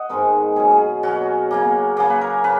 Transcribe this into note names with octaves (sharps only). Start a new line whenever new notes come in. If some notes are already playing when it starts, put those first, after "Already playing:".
Already playing: D#5 F#5
G#2 D#3 G#3 B3 A#4
B2 F#3 C#4 G#4
G#4
B2 F#3 C#4 F#4
C#3 F#3 A#3
C#3 F#3 A#3 G#4
B4
A#4
C#3 B4